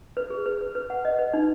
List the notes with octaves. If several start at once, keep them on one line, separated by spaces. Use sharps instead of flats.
B4
G#4
B4
B4
B4
F#5
D#5
B4
D#4